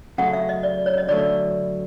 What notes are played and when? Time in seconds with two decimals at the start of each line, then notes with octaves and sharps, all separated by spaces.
0.18 C#3 F#3 A3 F#5
0.33 E5
0.49 D#5
0.63 D5
0.86 C#5
0.98 D#5
1.08 D3 F#3 A3 D5